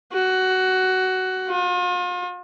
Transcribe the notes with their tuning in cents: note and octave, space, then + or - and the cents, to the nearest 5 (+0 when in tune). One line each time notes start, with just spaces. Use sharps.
F#4 +15
F4 +40